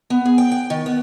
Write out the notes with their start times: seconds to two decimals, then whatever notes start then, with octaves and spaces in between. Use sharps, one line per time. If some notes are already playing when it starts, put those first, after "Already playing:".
0.10 B3
0.25 G#4
0.38 G5
0.52 G5
0.70 D#3
0.86 B3